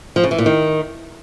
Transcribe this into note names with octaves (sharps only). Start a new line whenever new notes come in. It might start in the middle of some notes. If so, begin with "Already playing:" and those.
F3
C#3
E3
A#2
D#3